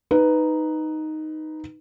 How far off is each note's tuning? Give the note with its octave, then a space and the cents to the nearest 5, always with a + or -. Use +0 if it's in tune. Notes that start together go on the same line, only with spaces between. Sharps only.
D#4 +0 B4 +5